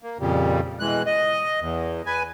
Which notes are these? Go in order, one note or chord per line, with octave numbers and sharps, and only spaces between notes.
A#3
F2 A#2 C#3 G3
B2 E3 G#3 F#6
D#5
E2
B4 G#5